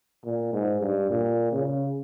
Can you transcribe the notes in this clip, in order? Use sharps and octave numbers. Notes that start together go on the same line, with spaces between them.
A#2
G#2
G2
A#2
C#3